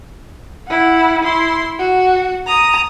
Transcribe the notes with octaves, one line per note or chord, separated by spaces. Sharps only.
E4 F#5
E4 C6
F#4
A#5 D#6